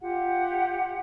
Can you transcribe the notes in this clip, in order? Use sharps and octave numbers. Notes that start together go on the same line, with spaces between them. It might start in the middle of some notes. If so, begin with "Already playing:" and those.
F4 G4 F#5